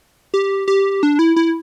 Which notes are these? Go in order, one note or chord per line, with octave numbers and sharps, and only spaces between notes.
G4
G4
D4
E4
E4